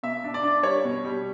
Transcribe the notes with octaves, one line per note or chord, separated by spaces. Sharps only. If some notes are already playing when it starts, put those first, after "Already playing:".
B2 E5
D4
D5
D4
G3 C#5
B2
G3